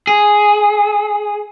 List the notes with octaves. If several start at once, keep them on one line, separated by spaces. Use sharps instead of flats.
G#4